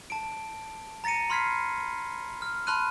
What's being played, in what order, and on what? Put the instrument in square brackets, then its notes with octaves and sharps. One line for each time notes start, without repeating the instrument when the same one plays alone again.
[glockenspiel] A5 D7
A#5 A6 A#6 C#7 D#7
B5 C6 F6 G#6 B6 C7
F6
A5 B5 C6 F6 F#6 D#7